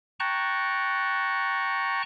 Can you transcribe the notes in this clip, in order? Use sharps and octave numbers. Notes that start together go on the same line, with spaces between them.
G5 A5 A#5 C#6 F#6